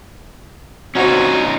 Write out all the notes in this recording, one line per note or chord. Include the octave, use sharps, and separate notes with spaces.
C4 C#4 D#4 F4 F#4